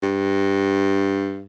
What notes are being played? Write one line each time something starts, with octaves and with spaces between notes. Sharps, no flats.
G2